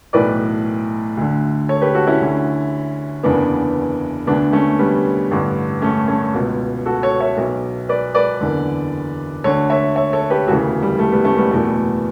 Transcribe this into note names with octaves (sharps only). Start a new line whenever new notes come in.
B1 A2 E3 B4 D5
D2 D3
A4 C#5
G4 B4
F#4 A4
C#4 E4
D2 D3
F#1 E2 C#3 B3 D4
D2 D3 B3 D4
A3 C#4
G3 B3
A1 G2 D3
A3 C#4
A3 C#4
C#2 B2
F#4 A4
A4 C#5
C#5 E5
B1 B2
B4 D5
B4 D5
F#1 E2 D3
D2 D3 A4 C#5
C#5 E5
C#5 E5
A4 C#5
G4 B4
E1 D2 C#3 E3 F#4 A4
G3
A3
G3 B3
A3 C#4
G3 B3
F#1 E2 B2 A3